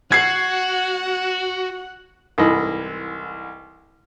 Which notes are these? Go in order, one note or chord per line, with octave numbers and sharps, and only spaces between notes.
F#4 F#5 G#6 C7
C2 G#2 E3 A4 D#5 B5